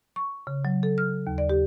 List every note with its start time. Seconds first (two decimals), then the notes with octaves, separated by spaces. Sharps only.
0.16 C#6
0.47 C#3
0.65 F#3
0.83 A4
0.98 F6
1.27 D#2
1.38 D5
1.50 G4